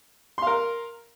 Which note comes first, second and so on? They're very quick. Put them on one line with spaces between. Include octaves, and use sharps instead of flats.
C6 F5 A#4